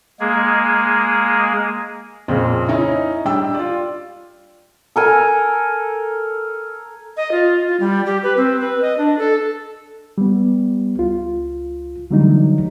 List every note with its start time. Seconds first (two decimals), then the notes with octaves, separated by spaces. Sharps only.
0.20 G#3 A#3 G#4
2.28 F2 A#2 C#3 C4
2.68 C#4 D#4 E4
3.25 G3 D4 G5 E6
3.55 F4 D5
4.96 A4 A#4 G#5
7.17 D#5
7.32 F4
7.67 F4
7.80 G3
8.06 G4
8.23 B4
8.37 C4
8.61 B4
8.82 D#5
8.98 D4
9.18 A4
10.18 G3 B3
10.99 C#2 F4
12.11 D3 E3 F#3 G3 A3 D#4